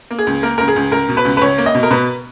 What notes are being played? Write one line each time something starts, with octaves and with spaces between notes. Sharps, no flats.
A#3
G#4
C#2
A#3 A#4
C#2 A#4
G#4
C#2
C#2 A#4
B2
B4
C#2
B4
C#2 C#5
A#3
D#5
B2
A#4
B2 B4